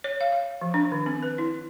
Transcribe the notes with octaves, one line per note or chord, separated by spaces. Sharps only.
C#5
F5
F5
F3
D4
D#3
C4
B4
E4